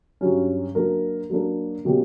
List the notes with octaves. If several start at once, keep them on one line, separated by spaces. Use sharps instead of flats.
G2 F#3 C#4
F#3 A#3 D4 A#4
F#3 A#3 D4 A#4
B2 F#3 A#3 C#4 G4